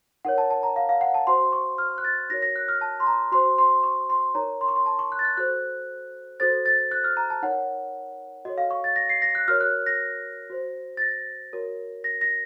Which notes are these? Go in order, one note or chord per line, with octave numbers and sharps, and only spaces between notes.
D#4 A#4 C#5 F#5
A5
A5
A#5
F5
F5
F#5
A5
F#4 C5 C6
C#6
F6
F#6
A6
D#4 F#4 A#4 C#5 A#6
A#6
F#6
F6
A5
C6
A#5
F#4 C5 C6
C6
C#6
C6
D#4 A#4 C#5 A#5
C6
C#6
C6
A5
C#6
F#6
A6
F#6
F#4 A4 C5 F#6
F#4 A4 C5 A6
A6
F#6
F6
A#5
A5
D#4 A#4 C#5 F#5
F#4 A4 C#5 D#5
F5
C#6
A6
A#6
C7
A#6
F#6
F#4 A#4 C#5 F6
F#6
A#6
F#4 C5
A6
A#6
F#4 A#4 C#5
A#6
A#6